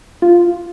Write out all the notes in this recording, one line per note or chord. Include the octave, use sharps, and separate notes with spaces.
F4